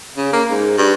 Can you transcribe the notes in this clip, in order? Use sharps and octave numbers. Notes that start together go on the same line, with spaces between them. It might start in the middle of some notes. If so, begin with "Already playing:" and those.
C#3
A#3
G#2
G2